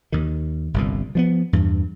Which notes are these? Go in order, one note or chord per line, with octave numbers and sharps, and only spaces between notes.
D#2 D#3
G1 C2 A#2
F3 G#3 B3
E2 G2